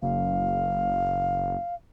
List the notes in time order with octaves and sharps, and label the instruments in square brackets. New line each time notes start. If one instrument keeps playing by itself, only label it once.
[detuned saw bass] F#1 [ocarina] F5